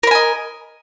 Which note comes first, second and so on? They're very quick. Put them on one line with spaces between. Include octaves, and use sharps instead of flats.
A#4 B5 G#5 D#5